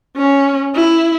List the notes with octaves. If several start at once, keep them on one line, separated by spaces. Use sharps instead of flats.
C#4
E4